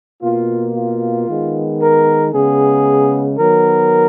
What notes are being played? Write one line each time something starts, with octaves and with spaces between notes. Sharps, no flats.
B2 A#3 F4
F4
D#3 G#3 B3
A#4
C#3 G#3 B3 G#4
D#3 F#3 B3 A#4